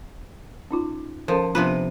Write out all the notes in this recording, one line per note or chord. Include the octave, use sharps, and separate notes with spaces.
C#4 D#4 F4
F3 C#4 A4 A#4
C3 F3 B3 D4 F4 B4